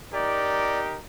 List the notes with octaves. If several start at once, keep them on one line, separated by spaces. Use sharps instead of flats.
D#4 G4 A#4 D5